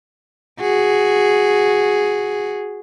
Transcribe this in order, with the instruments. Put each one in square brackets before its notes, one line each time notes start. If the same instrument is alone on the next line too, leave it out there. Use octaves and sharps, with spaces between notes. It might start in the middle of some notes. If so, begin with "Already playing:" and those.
[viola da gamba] F#4 G#4